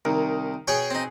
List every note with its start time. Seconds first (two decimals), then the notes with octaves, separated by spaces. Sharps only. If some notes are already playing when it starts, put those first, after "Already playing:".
0.05 C2 D#3 A#4
0.68 B2 G#4 C#5 G5 C#6
0.90 C4 D#4